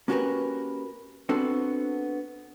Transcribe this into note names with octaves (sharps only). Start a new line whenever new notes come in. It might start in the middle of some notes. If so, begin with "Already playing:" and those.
A#3 C#4 F#4 G4 A#4 B4
B3 C4 D4 F#4 A4 C5